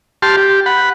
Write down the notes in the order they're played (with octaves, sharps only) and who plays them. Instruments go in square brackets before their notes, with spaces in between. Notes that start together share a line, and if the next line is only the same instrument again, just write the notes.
[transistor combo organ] G4 A5 C6 F6
G4
F#5 B5